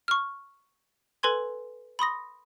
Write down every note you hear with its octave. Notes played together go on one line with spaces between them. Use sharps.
C#6 F6
A4 B4 G#5 C6 G#6
B5 C6 D#6 A#6